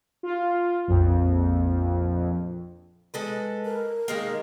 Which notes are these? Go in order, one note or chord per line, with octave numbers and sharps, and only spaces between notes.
F4
A#1 F2
G#3 A4 B4
A#4
D#3 G#3 A#3